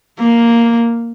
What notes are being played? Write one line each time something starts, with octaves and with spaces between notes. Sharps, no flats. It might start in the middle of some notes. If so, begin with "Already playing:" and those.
A#3